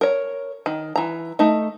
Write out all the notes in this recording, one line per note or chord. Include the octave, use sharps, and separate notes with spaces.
A#4 C#5
D#3
E3 A#5
A3 D#4